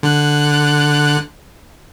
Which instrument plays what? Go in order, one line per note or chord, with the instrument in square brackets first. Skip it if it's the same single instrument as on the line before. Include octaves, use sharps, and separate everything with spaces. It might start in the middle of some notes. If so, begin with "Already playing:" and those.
[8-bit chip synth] D3 F#6